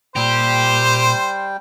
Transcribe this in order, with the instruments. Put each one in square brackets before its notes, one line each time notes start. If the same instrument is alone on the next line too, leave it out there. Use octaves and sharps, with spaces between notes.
[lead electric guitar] A#2 [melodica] G3 G5 [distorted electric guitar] G4 [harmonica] C5